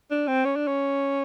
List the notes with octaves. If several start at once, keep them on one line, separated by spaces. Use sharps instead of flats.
D4
C4
C#4
D4
C#4